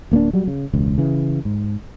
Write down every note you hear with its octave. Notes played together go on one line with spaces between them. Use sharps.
D1 A#3 B3 D4
F#3 G3
C#3
E1 C#2
C#3 E3
G#2